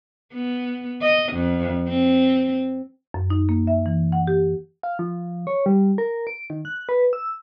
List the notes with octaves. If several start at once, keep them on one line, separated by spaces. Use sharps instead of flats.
B3
D#5
F2
C4
F#2
D#4
A#3
E5
E3
F#5
G4
F5
F3
C#5
G3
A#4
D7
D#3
F#6
B4
E6